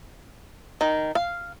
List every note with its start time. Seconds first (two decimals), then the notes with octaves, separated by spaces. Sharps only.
0.81 D#3
1.15 F5